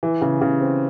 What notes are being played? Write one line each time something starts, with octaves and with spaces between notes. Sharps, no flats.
E3
C#3
C#3
C4